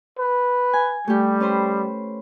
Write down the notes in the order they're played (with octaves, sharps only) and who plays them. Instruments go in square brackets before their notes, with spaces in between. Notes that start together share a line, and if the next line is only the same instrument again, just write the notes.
[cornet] B4
[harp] G#5
[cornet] G3 [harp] A3 G4
[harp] C#4 B4 C5